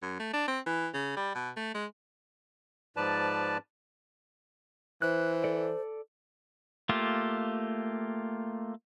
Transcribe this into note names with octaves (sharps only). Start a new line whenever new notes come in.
F#2
A3
D4
C4
E3
C#3
G3
B2
A3
G#3
G#2 F3 B4 D5 A5
E3 C5 F#6
A4 D5
A3 A#3 F4 G4